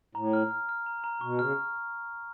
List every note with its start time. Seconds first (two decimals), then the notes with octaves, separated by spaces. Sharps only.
0.15 A2 A#5
0.33 F6
0.51 F6
0.69 F6
0.86 A#5
1.04 A#5
1.21 B2 C#6
1.39 C#3 F6